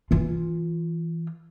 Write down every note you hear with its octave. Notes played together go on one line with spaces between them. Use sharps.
E3 F4